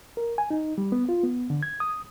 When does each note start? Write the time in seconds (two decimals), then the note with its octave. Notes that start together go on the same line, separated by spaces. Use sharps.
0.17 A#4
0.38 G#5
0.50 D#4
0.78 G3
0.92 B3
1.09 F4
1.23 B3
1.50 D3
1.63 G#6
1.80 D#6